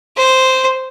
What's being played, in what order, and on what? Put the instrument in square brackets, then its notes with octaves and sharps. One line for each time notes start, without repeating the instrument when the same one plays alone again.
[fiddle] C5